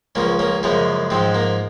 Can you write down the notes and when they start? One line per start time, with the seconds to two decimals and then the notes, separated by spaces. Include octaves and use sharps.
0.15 C#2 C#3 F3 A#3 C#4
0.39 A#3 C#4
0.63 F#2 C#3 F3 G#3 A#3
1.10 G#2 F3 G#3 C4
1.34 A#3